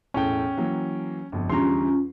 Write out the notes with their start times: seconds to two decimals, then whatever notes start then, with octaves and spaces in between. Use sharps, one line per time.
0.14 E1 A2 C#4 A4 G5
0.57 E3 F#3 A#3
1.32 G1 F2
1.50 E2 D3 G3 C#4 F4 A#5 C6